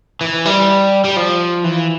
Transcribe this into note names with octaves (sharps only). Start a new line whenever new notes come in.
E3
G3
G3
F3
E3